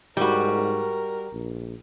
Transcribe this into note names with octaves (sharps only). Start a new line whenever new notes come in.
G#2 G3 F#4 A#4
A#1